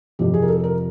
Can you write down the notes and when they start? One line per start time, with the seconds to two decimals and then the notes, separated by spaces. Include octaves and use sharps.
0.19 F2 C3 F3 G4
0.34 G#4
0.42 A#4
0.49 A4
0.64 A#4